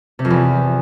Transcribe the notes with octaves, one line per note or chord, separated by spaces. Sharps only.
C3
F2
E2